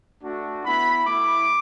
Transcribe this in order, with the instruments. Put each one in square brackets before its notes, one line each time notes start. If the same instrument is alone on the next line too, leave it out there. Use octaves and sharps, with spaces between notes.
[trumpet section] A3 D4 F#4
B3 E4 B5
A3 E4 D6